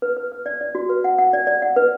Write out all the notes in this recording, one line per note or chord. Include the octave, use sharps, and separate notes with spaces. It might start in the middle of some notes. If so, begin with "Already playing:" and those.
B4
B4
B4
D5
D5
F#4
B4
F#5
F#5
D5
D5
F#5
B4